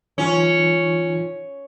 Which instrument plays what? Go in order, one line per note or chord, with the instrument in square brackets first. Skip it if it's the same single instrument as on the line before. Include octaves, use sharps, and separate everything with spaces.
[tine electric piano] E3 D#4 F4 [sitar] C#4